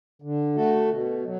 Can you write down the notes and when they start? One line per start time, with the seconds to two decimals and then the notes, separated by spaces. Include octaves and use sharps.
0.22 D3
0.55 A3 F#4 A4
0.90 B2
1.25 F#3